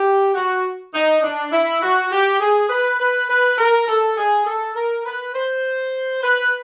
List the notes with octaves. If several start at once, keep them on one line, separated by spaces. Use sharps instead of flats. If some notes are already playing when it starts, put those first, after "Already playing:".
Already playing: G4
F#4
D#4
D4
E4
F#4
G4
G#4
B4
B4
B4
A#4
A4
G#4
A4
A#4
B4
C5
B4